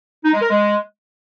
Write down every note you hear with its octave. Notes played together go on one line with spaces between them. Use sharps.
D#4
G#3
A#4
G#3